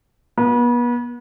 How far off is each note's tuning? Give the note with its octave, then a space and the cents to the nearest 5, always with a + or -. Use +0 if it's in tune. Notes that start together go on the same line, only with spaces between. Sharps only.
B3 -35